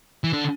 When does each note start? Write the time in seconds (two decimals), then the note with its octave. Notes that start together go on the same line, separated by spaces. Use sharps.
0.24 E3
0.33 D3